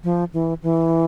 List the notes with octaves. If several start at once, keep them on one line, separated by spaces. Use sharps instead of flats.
F3
E3
E3